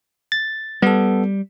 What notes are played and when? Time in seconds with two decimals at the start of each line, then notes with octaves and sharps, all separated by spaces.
0.32 A6
0.82 G3 B3 A4